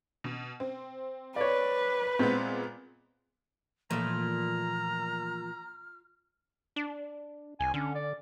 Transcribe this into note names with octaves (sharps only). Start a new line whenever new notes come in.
B2
C4
B4 C#5 D5
A#2 G#3 B3 C4
A#2 E3 F3 A3 A#5 F6
D4
C2 G#5
D3 C#4
D5